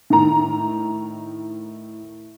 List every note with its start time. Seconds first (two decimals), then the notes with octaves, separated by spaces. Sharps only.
0.10 A2 D#3 A#5